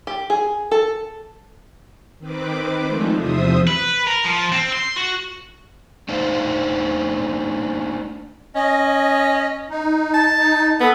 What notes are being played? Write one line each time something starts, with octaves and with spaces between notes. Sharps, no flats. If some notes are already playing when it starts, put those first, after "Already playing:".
G4
G#4
A4
D#3 C4 B4 D6
F3 G#3 A3 D4 D#4
E2 C3 F3 C5 E5 D#6
B4
A#4
F3
C4
C6
F#4
A3 D4 D#4 C5 F5
C#4 D#5
D#4
A5
D#4
B3 A4